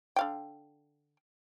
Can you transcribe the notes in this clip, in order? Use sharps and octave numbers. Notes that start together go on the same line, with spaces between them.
D3 F5 G5